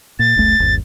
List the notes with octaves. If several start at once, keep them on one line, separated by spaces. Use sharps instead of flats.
A#2 A6
F#1 C#2 A3
G1 D#2